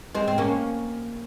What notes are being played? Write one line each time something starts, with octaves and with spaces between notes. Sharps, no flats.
G#3 C4
C4
A#3 C#4